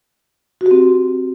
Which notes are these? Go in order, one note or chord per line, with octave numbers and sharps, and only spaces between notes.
F#4
G4
C4